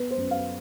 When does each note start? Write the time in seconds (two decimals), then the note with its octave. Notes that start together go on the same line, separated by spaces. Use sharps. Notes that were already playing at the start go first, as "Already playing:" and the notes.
Already playing: B3 B4
0.11 C5
0.17 F#2
0.31 F5